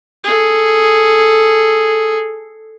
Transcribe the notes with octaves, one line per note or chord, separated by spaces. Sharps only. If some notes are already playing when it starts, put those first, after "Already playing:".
G#4 A4